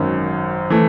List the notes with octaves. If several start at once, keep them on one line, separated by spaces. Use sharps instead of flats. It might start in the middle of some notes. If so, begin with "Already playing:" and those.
Already playing: G#1 F#2 D#3
E3 A3